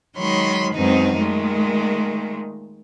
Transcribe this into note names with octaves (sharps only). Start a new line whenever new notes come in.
D#3 F#3 G#3 C#5 B5 C6
F#2 B2 D#3 G#3 C4 D#4
A#2 D#3 G#3 A3